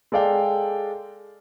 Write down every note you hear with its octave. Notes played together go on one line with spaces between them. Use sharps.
G#3 A4 D5 F5 G5